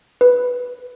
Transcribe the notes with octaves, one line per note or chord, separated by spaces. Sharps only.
B4